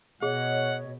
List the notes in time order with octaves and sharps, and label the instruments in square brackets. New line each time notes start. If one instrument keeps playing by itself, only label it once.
[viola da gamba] B2 [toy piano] G#4 [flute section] C#5 D#5 [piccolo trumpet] F#5